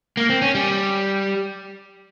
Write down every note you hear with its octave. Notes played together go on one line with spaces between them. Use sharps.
A#3
C4
C#4
G3